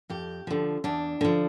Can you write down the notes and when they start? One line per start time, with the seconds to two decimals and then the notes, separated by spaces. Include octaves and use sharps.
0.10 F2 G4
0.47 D3 F3
0.84 E2 D4
1.21 D3 F3